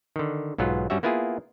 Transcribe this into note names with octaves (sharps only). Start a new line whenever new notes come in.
D3 D#3
B1 G#2 F#3 B3 F4
G2 G3 C#4 F#4 E5
A#3 B3 E4 F4 G#4